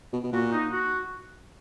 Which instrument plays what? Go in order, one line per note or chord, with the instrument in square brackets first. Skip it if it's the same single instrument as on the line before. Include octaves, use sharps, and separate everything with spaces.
[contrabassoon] B2
B2
[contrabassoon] A#2 [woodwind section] F#4
[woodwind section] D#4
F#4